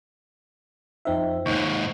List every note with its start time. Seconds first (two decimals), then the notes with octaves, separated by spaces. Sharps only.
1.05 F2 D#4 F4 C5 E5 G5
1.46 D#2 G#2 D#4 C#6